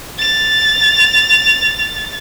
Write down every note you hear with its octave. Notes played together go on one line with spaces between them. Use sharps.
A6 F7